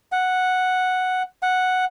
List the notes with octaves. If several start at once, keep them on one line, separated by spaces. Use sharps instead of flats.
F#5
F#5